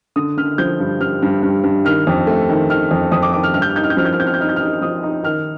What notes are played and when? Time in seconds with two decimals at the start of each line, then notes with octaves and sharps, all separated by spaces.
0.16 D3 D#6
0.37 D3 F6
0.58 F3 G6
0.80 G2
1.00 G2 F6
1.22 G2
1.43 G2
1.64 G2
1.85 D#3 F6
2.07 F2
2.27 A3
2.49 D#3
2.69 D#3 F6
2.91 F2
3.12 F2 D#6
3.22 D6
3.33 D#3 D6
3.43 F6
3.54 G2 F6
3.62 G6
3.70 F6
3.76 D#4 G6
3.84 F6
3.90 G6
3.97 F3 F6
4.05 G6
4.13 F6
4.19 C4 G6
4.27 F6
4.34 G6
4.40 D#4 F6
4.49 G6
4.56 D#4 F6
4.81 F3 D#6
5.03 D#4
5.23 D#3 F6